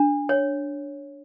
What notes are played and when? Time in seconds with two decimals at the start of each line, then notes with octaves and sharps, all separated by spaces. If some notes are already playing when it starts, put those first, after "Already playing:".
Already playing: D4
0.29 C#5